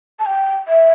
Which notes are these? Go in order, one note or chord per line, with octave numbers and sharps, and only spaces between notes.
A5
G5
E5